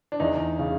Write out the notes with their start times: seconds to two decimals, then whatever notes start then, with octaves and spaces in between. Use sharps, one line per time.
0.12 D4
0.20 E2 D#4
0.59 C#3